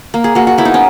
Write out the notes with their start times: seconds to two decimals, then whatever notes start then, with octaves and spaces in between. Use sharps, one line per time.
0.14 A#3
0.24 G#4
0.35 A#3 F#4
0.47 F#4
0.58 B3 E4
0.65 D#4
0.74 C#4